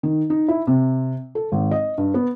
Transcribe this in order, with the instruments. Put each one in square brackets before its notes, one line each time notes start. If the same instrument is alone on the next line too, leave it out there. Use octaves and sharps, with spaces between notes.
[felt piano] D#3
D#4
E4
C3
A4
G#1
D#5
G2
B3